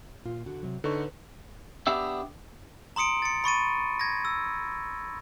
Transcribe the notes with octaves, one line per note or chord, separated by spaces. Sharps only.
A#2 F4
D3 F#4
C3 F#3
D3 D#4 A4 B4 C#5 C#6
B3 D4 G4 E5
A#5 C6 D#6 C#7 D7
A6 C#7
B5 C#6 A6 D#7
G#6 A#6
E6